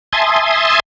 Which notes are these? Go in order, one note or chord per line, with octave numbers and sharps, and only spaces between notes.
E5 G#5 A5 C6 D#6